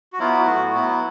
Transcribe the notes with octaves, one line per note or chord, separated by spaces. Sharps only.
F#4
F#3 B3 E4 F4
A2 F#4
F#3 B3 E4